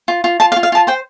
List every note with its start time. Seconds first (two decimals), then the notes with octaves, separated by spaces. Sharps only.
0.08 F4
0.24 F4
0.40 F4 A5
0.52 F5
0.56 F4
0.63 F5
0.72 F4 A5
0.87 C5 G5